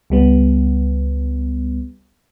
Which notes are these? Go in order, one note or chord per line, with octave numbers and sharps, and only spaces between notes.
C#2 G3 B3